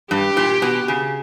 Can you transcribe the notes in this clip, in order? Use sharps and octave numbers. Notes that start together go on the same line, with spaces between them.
G2 G4
A#2
B2
C#3